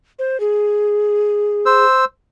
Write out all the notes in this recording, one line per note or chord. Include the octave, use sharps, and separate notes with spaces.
C5
G#4
C5 E6